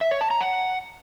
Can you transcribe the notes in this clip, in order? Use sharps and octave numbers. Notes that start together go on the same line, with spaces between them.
E5
C#5
A5
A#5
F#5